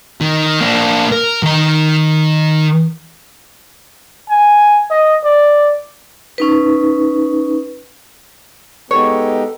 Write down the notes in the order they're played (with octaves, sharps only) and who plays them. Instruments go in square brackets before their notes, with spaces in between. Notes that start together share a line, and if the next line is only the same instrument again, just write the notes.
[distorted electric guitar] D#3
A#3 D4
A#4
D#3 D#5
[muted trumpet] G#5
D#5
D5
[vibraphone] C#4 D#4 B4
[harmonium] G#3 D#4 G4 [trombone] B3 [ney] A4 [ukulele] C#5